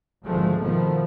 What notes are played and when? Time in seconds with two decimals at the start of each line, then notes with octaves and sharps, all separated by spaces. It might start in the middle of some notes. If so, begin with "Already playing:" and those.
0.24 G#1 D2 D3 F3 G#3 A3
0.61 B2 D#3 F3 A3 B3